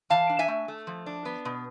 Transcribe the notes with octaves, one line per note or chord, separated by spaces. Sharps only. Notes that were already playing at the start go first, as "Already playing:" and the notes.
E3 F5 A5
D4
E5 G#5
A3
A3
F3
D4
B3
B2